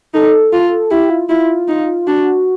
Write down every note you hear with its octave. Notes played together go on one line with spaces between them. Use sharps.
D#4 A4
F4
E4 G4
F4
E4 F4
D#4
D4 F#4